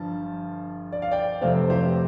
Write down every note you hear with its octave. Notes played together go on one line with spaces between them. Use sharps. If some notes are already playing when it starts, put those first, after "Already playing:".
Already playing: G1 G2 F3 A5
D5
F5
D5 G5
F1 F2 C3 A3 C4 C5 F5
G4 C5